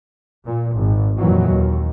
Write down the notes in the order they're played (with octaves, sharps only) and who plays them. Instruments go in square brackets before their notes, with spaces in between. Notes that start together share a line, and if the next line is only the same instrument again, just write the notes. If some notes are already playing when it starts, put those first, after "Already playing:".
[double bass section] A#2
G#1
F2 A#2 D#3 E3 F#3
D#2